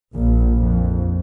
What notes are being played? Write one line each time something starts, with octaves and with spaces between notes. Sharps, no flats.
A#1
F2